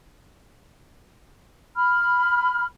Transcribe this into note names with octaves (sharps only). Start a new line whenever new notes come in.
B5 F6